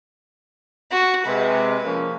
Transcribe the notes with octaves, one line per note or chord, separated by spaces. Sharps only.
F#4
C3 G#3 B4
F3 A#3 C#4